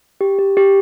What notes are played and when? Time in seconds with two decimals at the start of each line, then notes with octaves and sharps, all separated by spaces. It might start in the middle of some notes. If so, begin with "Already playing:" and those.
0.21 G4
0.39 G4
0.57 G4